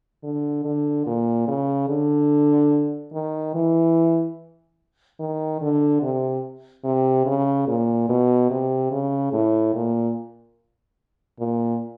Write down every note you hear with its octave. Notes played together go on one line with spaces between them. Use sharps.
D3
D3
A#2
C#3
D3
D#3
E3
D#3
D3
C3
C3
C#3
A#2
B2
C3
C#3
A2
A#2
A#2